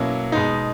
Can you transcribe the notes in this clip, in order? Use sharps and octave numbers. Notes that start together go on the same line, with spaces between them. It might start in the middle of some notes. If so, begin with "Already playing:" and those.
Already playing: B2 F#3 A#3 C#4 E4
B2 G#3 D#4